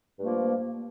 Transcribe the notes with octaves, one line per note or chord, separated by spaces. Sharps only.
G2 F3 A3 A#3